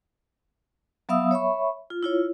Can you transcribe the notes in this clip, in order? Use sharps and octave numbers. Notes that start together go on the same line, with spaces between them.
F#3 B3 E5 F5 D#6 E6
C#5 E5 B5 C#6
F4
E4 F4 C#5